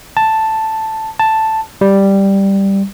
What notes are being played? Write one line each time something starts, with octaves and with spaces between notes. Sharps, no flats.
A5
A5
G3